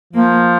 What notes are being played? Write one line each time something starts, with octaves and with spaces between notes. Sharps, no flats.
F3 A#3